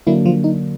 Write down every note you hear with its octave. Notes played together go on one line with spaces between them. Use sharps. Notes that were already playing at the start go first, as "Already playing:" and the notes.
D3 F#3 A#3 D4 E4
F3 F4
D#4